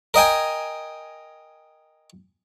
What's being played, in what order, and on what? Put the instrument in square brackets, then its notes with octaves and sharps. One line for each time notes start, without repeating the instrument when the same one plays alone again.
[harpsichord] A#4 D#5 G5 G#5